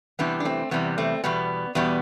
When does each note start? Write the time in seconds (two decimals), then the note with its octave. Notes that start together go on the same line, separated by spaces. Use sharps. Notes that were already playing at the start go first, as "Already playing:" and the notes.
0.19 E2 C3 E3 G3 B3 D4
0.40 D4
0.45 A3 C4
0.71 E2 C3 E3 G3 B3
0.98 A3 C4
1.24 E2 B2 G3 B3
1.75 E2 B2 G3 B3